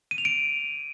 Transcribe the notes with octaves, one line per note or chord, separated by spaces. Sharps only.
D#7
F7
D7